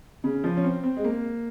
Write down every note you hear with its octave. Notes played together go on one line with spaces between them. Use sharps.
C#3
F3
C#4
C4
C4
G#3
A#3